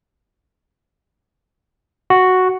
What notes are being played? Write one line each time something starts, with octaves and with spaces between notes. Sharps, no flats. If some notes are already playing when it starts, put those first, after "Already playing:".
F#4